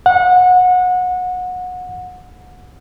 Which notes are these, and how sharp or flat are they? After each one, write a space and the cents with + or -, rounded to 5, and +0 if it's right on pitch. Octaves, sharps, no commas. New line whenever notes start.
F#5 -25